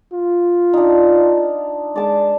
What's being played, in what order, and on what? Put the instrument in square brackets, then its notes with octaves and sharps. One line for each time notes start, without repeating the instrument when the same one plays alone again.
[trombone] F4
[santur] D4 D#4
[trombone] G#3 [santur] D5 A5 D6